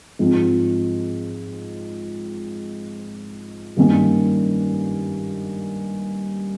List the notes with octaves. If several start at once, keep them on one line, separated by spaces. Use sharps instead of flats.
G#2 F3 C4
G2 D#3 A#3 C#4